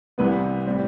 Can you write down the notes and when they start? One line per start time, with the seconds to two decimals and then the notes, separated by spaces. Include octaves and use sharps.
0.18 C2 C3 E3 G3 B3 B4
0.67 A2 G3 C4